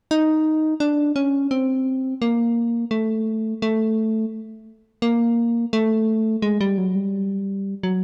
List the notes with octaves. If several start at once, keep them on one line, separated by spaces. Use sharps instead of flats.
D#4
D4
C#4
C4
A#3
A3
A3
A#3
A3
G#3
G3
F#3
G3
F#3